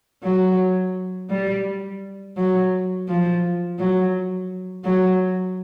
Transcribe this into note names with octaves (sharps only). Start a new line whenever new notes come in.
F#3
G3
F#3
F3
F#3
F#3